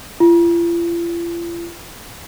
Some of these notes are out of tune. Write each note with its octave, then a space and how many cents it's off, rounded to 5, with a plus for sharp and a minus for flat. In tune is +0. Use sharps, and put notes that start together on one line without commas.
F4 -45